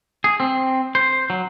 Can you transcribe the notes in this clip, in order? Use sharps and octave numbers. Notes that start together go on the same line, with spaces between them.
G#4
C4
C5
F#3